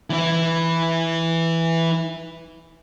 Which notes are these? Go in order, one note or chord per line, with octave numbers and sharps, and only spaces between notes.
E3 E4